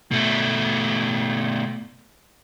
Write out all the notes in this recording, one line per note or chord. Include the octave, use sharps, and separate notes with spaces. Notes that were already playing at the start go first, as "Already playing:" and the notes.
B2 A3